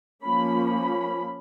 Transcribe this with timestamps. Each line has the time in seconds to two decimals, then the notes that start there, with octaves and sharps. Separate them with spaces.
0.24 F3 A#3 C#4 B5
0.69 B5